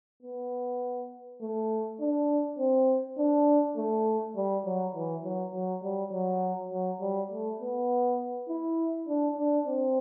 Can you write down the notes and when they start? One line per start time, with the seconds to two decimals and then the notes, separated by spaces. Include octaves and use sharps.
0.23 B3
1.41 A3
2.00 D4
2.59 C4
3.18 D4
3.77 A3
4.36 G3
4.66 F#3
4.95 E3
5.24 F#3
5.54 F#3
5.83 G3
6.13 F#3
6.71 F#3
7.01 G3
7.31 A3
7.60 B3
8.49 E4
9.08 D4
9.37 D4
9.67 C4